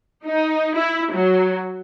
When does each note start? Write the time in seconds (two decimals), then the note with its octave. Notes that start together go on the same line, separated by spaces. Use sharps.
0.25 D#4
0.75 E4
1.13 F#3